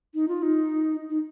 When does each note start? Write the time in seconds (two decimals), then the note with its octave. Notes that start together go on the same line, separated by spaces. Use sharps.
0.14 D#4
0.28 F4
0.42 D#4
1.10 D#4